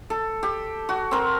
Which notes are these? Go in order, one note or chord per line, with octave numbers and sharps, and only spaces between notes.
A4
G4
F#4
C4 A#4